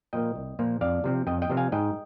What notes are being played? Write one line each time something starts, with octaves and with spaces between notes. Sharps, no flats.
A#2 F3 A#3 D#5 G5
C2
A#2 F3 A#3
F2 D5 F5
C3 F3 C4
F2 D#5 G5
D#5 G5
C3 F3 C4
F5 G#5
G#2 D#5 G5